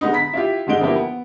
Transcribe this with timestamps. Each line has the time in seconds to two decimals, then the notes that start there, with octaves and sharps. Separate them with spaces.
0.01 D3 G#3 B3 D#4
0.13 A#5 B5 B6
0.33 E4 F4 G4
0.67 G1 D3 G#3 D#4 D7 G7
0.81 F3 A#3 B3 E4 G4
0.96 B3